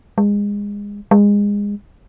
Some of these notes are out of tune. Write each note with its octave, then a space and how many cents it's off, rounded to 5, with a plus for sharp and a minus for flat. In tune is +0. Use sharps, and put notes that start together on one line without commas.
G#3 -25
G#3 -25